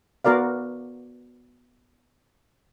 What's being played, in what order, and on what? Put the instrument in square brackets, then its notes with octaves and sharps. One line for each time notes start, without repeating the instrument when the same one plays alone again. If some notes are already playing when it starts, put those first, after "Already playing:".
[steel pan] B3 F#4 A#4 D5 F5